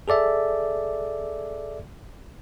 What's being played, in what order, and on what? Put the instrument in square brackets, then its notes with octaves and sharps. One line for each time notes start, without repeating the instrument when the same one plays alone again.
[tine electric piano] G#4 A4 D5 E5